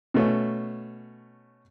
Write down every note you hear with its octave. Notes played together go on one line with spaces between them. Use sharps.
B2 A3 C#4